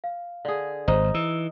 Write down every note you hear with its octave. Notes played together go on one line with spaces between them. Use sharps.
F5
D3 G#4
G#1 D#4 C5
E3 E6